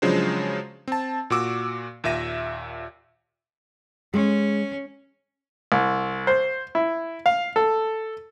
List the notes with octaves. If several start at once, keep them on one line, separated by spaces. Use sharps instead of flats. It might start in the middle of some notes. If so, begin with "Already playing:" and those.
C#3 F3 F#3 G#3 D4 C5
C4 A5
A#2 F#4 D6 E6
D#2 A#2 E5 A#6 D#7
G#3 C#4
C2
C5
E4
F5
A4